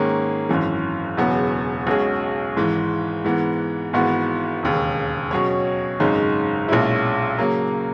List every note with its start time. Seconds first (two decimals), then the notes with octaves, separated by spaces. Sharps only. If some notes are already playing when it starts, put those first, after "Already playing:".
Already playing: G#2 D#3 A#3 C#4 G#4
0.49 G#1 F#2 E3
1.17 E1 E2 C#3 F#3 B3
1.87 B1 B2 G#3 C#4 G#4
2.56 G#1 G#2 E3
3.24 G#2 E3 B3
3.93 G#1 G#2 E3 B3 F#4
4.63 E1 D#2 C#3
5.31 B2 F#3 C#4 G#4 C#5
6.00 G#1 F#2 C#3 G#3 D#4
6.69 B1 A#2 G#3 C#4 E4
7.39 C#3 F#3 A#3